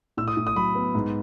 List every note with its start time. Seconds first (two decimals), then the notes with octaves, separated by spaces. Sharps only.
0.17 A2 E6
0.28 D#6
0.37 A2
0.47 D#6
0.56 F#3 B5
0.75 B3
0.95 G#2